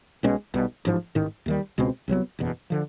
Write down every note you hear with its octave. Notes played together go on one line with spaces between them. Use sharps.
B1 B2 G#3 C#4
B1 B2 G3
A1 G#2 F3
A1 G#2 D#3
D#2 D#3 G3
C#2 B2 G#3 C4
C2 B2 F#3 B3
F#1 E2 B2
D3 F3